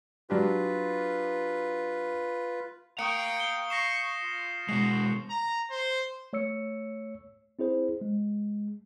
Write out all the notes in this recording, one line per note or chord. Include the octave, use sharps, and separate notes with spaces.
F#3 D4 F4 G4 B4
F5 G5 A#5 C#6 D#6 C#7
G6 G7
C#6 A#6 C7 E7
F4
B2 G#3 F#4 C7
A#5
C5
A3 C#5 E6 C#7
C4 E4 G#4 C5
G#3